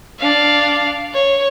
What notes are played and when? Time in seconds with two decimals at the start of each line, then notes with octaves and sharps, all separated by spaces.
0.19 D4 F5
1.14 C#5